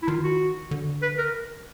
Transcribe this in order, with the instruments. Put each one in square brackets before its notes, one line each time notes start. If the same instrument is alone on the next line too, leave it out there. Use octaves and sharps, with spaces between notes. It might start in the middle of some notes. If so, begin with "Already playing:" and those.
[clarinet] E4
[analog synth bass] D#3 [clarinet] F4
[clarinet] F#4
[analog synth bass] D3
[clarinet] B4
A#4